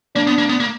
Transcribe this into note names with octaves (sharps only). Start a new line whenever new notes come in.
A#3 D4
B3
A#3
B3
A#3